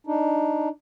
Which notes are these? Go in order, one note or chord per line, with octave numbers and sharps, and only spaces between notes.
D4 D#4